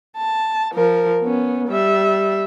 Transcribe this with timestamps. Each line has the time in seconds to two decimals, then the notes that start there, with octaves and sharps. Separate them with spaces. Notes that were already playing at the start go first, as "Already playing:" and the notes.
0.17 A5
0.74 F3 A#4
1.22 B3 C#4
1.69 G3 E5